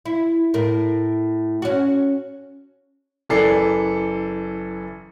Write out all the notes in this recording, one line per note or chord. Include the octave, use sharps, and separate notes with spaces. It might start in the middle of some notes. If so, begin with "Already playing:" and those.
E4
A2 A#4
C#4 F#4
F#1 E3 A4 D5 C7